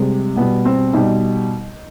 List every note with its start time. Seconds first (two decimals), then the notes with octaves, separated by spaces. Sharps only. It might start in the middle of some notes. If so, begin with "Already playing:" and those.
Already playing: C3 G3 G#3
0.36 B2 G3 B3
0.65 C4
0.93 B2 G3 D#4